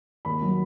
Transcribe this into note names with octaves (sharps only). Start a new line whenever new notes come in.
D#2 B5
F#3